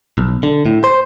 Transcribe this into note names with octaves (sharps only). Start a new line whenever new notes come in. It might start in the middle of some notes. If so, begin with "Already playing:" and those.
B1
D3
A2
C5